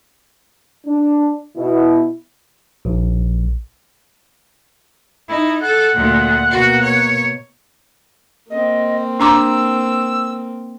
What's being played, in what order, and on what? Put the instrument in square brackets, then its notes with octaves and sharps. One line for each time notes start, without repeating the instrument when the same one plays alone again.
[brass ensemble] D4
B2 E4
[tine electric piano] A#1
[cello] D#4 [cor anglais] E4
[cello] A4 [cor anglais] F#5
[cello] D2 A#2
[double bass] B2 A#3 [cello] F#4
[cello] C#5
[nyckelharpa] A#3 C4 [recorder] D#5
[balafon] D4 A#5 D6 [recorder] E6